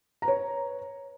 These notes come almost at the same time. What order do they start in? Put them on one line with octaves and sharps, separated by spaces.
A#5 B4 C#5